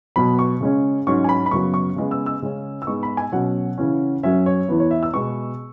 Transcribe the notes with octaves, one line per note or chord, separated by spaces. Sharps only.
B2 F#3 B3 B5
C#6
C#3 G#3 C#4
G#2 F#3 C#4 C#6
G#5
B5
B5
F#2 C#3 F#3 B3 C#6
C#6
C#3 G#3 B3
E6
E6
C#3 G#3 C#4
E6
G#2 G#3 B3 C#6
B5
G#5
B2 F#3 C#4 F#5
C#3 E3 C#4
F#2 F#3 C#4 E5
C#5
E2 E3 B3
C#5
E5
E6
B2 G#3 B3 C#6